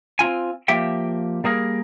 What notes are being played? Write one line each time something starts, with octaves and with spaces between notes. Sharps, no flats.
C4 D4 F4 G#5
F3 A#3 G4 E5 G5
G3 A#3 G#4 A#4